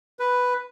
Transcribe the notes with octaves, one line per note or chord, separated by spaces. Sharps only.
B4